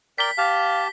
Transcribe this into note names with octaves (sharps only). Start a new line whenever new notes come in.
A#4 D5 G5 B6 G7
G4 F5 A5